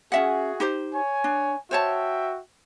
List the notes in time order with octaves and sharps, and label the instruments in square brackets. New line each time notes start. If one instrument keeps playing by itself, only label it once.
[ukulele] C#4 E5 F#5 [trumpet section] F#4 G#4
[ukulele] D#4 G4 C5
[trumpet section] C#5 G#5
[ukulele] D4
[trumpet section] F#4 E5 G5 [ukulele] C5 C#5 A5